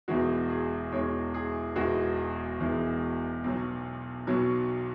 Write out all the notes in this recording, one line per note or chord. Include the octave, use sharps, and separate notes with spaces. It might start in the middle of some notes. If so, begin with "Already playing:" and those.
E1 E2 E3 G#3 F#4
G#4
E1 E2 E3 G#3 C#5
G#4
E1 E2 E3 G#3 F#4
E1 E2 E3 G#3
B1 B2 F#3
B1 B2 F#3